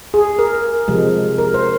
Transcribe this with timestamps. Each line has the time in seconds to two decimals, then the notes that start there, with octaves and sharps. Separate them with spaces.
0.14 G#4
0.39 A#4
0.88 C3 F3 G#3
1.38 A#4
1.54 C5